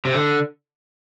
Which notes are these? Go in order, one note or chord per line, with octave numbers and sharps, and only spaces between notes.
C3
D3